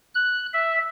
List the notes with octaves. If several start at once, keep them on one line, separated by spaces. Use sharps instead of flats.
F#6
E5